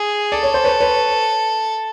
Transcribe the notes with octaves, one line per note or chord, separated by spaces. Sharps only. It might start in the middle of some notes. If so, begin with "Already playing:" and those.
Already playing: G#4
A4 D5
C#5
C5
B4 C#5
B4 C#5